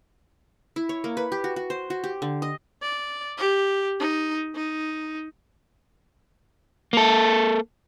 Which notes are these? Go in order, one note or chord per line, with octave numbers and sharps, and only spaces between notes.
E4
C#5
A#3
B4
G4
F#4
F#4
C5
F#4
G4
D3
D#5
D5
G4
D#4
D#4
A#3 A4